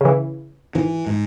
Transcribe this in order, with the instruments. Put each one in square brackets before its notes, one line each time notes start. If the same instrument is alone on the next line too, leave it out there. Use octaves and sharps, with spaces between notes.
[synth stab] C#3 E3
[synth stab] G#1 [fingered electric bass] E3
[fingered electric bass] G#2